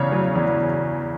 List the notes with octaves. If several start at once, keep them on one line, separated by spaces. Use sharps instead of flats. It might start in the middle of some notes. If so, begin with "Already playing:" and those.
Already playing: E2 C#3 C#5
F#3
E2